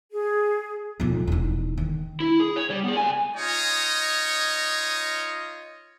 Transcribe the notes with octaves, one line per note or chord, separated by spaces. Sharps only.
G#4
B1 F2
E1 D#4
D#3
E4
G#4
C#5
G3
B3 G#4
C#2 G#5
D#4 F4 C#5 D#5